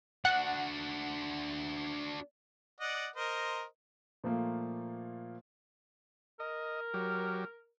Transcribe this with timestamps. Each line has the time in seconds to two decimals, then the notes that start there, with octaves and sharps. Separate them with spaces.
0.25 D4 F#4 F#5
2.80 D5 D#5 F#5
3.16 A#4 C5 D#5
4.24 A#2 F3 A3 A#3
6.40 A#4 D#5
6.94 F#3 G4